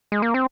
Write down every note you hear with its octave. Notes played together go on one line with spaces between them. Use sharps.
G#3
A#3
C4